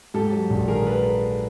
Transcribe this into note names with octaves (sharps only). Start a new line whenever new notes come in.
G#2 G4 A4
F#3
A#1
D#3 G#4 A#4
A4 B4